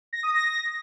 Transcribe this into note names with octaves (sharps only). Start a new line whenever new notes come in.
A#6
D#6
A#6